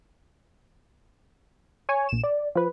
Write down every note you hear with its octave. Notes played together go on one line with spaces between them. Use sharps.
C#5 G#5 C#6
A#1 E7
D5
F3 B4